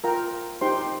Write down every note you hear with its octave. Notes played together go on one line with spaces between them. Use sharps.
F4 A#4 G5 A#5
D#4 G4 C5 G5 C6